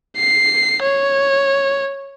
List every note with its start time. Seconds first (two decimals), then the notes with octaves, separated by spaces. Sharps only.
0.17 C7
0.82 C#5